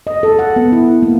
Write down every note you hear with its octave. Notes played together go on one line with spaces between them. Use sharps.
D#5
A4
F#5
B3
E4
A#3